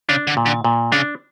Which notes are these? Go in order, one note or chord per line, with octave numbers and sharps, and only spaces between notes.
C#3 D4
D3
A#2
D3
A#2
C#3 D4